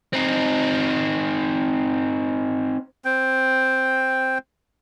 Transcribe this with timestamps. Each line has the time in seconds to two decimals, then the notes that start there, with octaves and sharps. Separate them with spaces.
0.13 C4 D#4
3.05 C4 G5